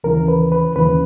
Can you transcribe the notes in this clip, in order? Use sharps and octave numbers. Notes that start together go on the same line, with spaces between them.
D#2 C#3 E3 A#4
B4
B4
D#2 C#3 E3 B4